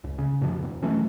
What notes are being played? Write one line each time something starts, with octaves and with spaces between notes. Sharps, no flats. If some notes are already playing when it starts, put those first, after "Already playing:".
C#2
C#3
F#2 B2 D3 F3
E2 B2
E3 F#3 A3 C#4